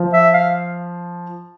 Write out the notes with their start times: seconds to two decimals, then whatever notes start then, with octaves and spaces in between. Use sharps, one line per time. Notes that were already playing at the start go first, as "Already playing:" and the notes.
Already playing: F3
0.13 E5
0.34 F5